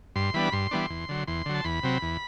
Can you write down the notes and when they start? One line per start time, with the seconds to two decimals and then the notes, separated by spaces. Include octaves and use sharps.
0.16 G2 C6
0.34 E3 G3 B3 D4 B5
0.52 G2 C6
0.71 E3 G3 B3 D4
0.90 E2
1.09 D3 F#3
1.27 E2 C6
1.46 D3 F#3
1.54 A5
1.64 E2 B5
1.83 C3 F#3 C4
2.02 E2